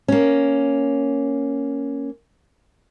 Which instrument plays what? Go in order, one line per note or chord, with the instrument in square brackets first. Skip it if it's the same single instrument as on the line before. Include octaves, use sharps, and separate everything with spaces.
[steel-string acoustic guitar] A#3 C#4